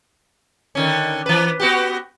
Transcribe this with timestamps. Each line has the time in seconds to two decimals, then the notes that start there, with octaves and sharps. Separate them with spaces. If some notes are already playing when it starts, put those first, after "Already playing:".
0.75 D3 D#3 C#4
1.26 E3 B4
1.60 B3 F#4 G4